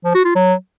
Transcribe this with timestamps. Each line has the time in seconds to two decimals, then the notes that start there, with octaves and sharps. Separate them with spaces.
0.05 F3
0.15 F#4
0.25 F4
0.35 F#3